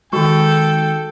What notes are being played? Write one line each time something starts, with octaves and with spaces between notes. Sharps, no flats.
D#3 G#3 F#4 A4 G5 C#6